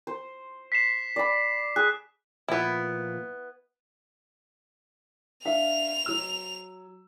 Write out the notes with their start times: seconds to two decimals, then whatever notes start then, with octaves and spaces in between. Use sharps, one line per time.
0.07 C5
0.72 B6 C7 E7
1.16 D5 B5
1.76 G#4 F#6
2.48 A#2 F3 B3 E4
5.45 D4 E5 F5 F7
6.06 F#3 E6